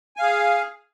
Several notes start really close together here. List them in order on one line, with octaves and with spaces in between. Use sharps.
G#5 F5 G#4